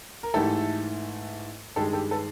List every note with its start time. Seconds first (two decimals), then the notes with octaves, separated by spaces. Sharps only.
0.23 A#4
0.34 G#2 E3 A3 G4 A4
1.76 G2 D#3 G#3 G4 A4
1.93 G4 A4
2.11 A4 B4